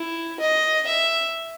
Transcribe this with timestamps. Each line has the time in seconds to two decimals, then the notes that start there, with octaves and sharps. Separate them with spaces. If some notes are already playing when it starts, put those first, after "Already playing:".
Already playing: E4
0.40 D#5
0.87 E5